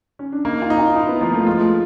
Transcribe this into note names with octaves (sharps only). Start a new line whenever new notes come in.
C#4
D4
A#3 D#4
F4
D#4
F4
D#4 E4
B3
F3 A#3
A3
G#3 F4
A3